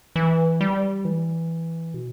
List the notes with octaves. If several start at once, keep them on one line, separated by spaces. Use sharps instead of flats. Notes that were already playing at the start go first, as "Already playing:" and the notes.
E3
G3
E3
B2